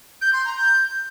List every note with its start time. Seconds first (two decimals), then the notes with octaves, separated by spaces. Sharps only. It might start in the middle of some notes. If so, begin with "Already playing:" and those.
0.21 G6
0.33 C6
0.45 A#5
0.56 G6